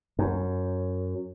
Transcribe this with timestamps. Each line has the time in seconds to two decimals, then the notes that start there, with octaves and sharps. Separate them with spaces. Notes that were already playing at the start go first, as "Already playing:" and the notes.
0.19 F#2